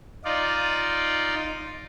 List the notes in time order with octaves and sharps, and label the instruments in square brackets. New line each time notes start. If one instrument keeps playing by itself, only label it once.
[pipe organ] D#4 F4 D5